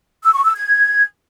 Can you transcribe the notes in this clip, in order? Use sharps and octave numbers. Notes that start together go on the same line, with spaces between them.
E6
C#6
E6
G#6